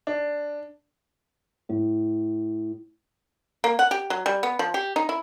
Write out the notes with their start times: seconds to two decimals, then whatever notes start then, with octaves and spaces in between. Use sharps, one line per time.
0.07 D4
1.69 A2
3.64 A#3
3.79 F#5
3.91 G4
4.10 F#3
4.26 G3
4.43 B3
4.59 F3
4.74 G4
4.96 D#4
5.09 E4